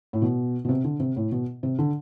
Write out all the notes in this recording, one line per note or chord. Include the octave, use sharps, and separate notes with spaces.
A2
B2
B2
C3
D3
C3
A2
B2
C3
D3